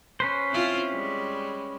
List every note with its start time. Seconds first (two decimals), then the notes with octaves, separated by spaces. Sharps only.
0.20 C#4 B4 C5
0.51 C4 E4 F4
0.91 G3 G#3